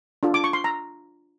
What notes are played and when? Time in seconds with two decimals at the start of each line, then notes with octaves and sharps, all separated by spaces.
0.23 D4 F4 A4
0.34 D6
0.44 C#6
0.53 C6
0.64 A#5